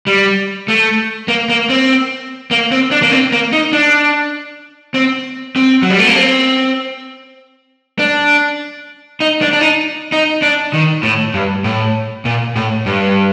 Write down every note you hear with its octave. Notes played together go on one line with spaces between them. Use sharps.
G3
A3
A#3
A#3
C4
A#3
C4
D4
A#3
C4
A#3
D#4
D4
C4
C4
F#3
G3
A3
A#3
C4
D4
D#4
D4
D4
D#4
D#4
D4
D#3
A2
G2
A2
A#2
A2
G2